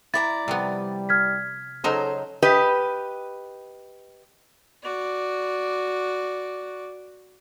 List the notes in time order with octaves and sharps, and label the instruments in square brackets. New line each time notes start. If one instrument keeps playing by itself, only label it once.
[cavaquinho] E4 D5 A#5 [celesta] A6
[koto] C3 F3 B3 [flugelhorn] G3
[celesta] F6 G#6 B6
[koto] C#3 F#3 D#4 [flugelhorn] A4 [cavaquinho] C5
[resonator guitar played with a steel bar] G4 B4 D#5
[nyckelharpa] F#4 D5